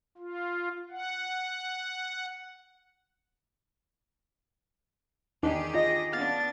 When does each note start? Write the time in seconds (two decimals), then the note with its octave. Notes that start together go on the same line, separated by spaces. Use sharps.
0.18 F4
0.91 F#5
5.43 E2 D#3 D4 D#4 G4 G#4
5.74 F4 D#5 A#6
6.13 B3 D4 F5 A6